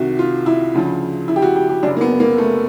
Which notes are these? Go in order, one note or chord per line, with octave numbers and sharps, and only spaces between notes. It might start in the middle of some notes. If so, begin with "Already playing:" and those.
Already playing: C2 C3 D#3 F#4
F4
E4
D2 C#3 F3
E4
G4
F#4
G4
G4
F#1 F#2 C#3 D4
A#3
B3
A#3
A3